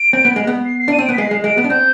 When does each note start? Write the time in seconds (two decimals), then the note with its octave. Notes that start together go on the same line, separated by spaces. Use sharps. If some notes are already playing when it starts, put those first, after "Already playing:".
Already playing: D7
0.13 C4
0.25 B3
0.36 G#3
0.47 B3
0.66 C7
0.79 C7
0.88 D4 D#7
0.98 C4
1.05 B3 D7
1.13 B6
1.18 G#3 C7
1.31 G#3
1.44 G#3 D7
1.58 B3
1.64 D4
1.70 C4 G6